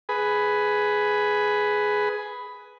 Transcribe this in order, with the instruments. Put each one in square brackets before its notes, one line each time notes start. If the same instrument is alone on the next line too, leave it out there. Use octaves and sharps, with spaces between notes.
[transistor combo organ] G#4 B4